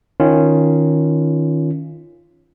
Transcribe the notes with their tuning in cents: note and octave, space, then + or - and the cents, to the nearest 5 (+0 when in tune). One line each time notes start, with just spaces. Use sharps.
D#3 +0 C#4 +0 F4 -20